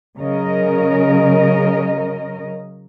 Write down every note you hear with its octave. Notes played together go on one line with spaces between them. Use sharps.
C#3 F#3 C#4 A#4 D#5